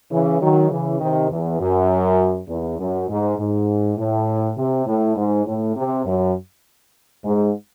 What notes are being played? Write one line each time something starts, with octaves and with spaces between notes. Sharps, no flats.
C#3 E3
D#3 F#3
C#3 E3
C3 D#3
E2
F#2
E2
F#2
G#2
G#2
A2
C3
A2
G#2
A2
C3
F#2
G#2